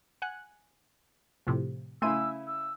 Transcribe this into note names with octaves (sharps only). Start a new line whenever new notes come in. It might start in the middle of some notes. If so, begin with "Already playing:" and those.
F#5 G#5 F#6
A2 C3 F3
C#3 A3 E4 G#5 C6 E6 D#7
E6